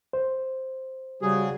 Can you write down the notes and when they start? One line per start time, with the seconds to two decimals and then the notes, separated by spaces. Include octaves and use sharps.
0.13 C5
1.22 C#3 G3 F#4 G#4